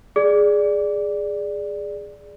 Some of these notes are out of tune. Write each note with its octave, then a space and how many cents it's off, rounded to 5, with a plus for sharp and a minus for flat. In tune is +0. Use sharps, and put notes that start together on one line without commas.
G#4 +0 D5 +0